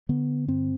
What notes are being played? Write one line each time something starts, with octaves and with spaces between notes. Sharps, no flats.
D3 B3
G2 C4